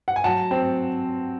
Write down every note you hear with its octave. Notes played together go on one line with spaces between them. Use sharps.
F#5
G#5
F#3 F#5 A5
C4